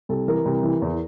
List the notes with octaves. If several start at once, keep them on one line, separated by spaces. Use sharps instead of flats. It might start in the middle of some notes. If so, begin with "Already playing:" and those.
C2 A4
E3 A#4
C2
E3
E2